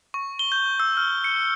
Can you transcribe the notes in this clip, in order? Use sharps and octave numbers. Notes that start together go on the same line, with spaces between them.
C#6
G7
G6
E6
F6
C#7